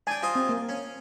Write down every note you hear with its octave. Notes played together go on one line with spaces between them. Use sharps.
D4 G5 G#5
F4 C5 D#5
C4
A#3
C#4